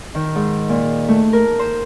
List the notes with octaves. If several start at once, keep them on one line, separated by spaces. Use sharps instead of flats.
D#3
G#2
A#2
A3
A#4
C5